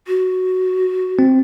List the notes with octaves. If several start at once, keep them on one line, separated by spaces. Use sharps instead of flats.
F#4
C4